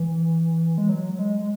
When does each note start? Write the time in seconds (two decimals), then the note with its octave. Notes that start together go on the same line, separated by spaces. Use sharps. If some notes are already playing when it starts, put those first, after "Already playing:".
Already playing: E3
0.78 G#3
0.89 F#3
1.13 F#3
1.19 G#3
1.39 G#3